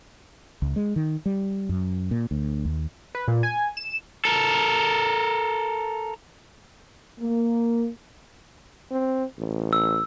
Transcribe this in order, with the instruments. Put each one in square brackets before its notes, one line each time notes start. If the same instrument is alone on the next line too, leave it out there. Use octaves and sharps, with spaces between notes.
[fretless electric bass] C#2
G#3
D#3
G3
F#2
A#2
D2
D#2
[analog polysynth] B4
A#2
G#5
E7
[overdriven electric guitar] A4 A#4
[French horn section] A#3
[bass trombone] C4
A1
[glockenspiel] E6